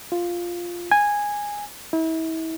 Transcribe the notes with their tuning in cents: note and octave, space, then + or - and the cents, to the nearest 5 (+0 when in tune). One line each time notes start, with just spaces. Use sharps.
F4 +0
G#5 -10
E4 -35